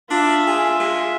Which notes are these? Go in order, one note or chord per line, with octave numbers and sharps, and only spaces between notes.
D4 F4 E5
G#4
G#3